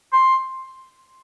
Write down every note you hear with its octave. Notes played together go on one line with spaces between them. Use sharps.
C6